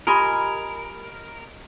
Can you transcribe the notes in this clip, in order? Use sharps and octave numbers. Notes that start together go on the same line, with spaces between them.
F4 G4 A#4 D#5 G#5 B5 C6